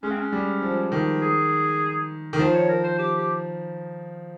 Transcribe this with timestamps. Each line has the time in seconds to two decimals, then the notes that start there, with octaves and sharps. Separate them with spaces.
0.03 G#3 C#4
0.11 C4
0.19 C#4
0.32 G3
0.62 F3
0.92 D#3
1.22 G#4
2.33 D#3
2.39 F3 C5
2.54 C#5
2.69 A#4
2.84 C5
2.99 G4
3.18 G4